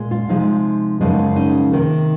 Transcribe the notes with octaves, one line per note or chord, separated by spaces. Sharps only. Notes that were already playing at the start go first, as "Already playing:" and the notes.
Already playing: A#2 G#3
F4
C3 F3 G#3 D#4
F#2 C#3 F3 G#3 D#4
C#4
D#4
C3 D#3 A#3